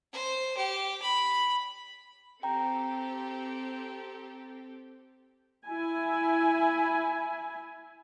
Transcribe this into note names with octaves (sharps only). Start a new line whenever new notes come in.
C5
G4
B5
C4 G4 A4 G5 A#5
E4 G#5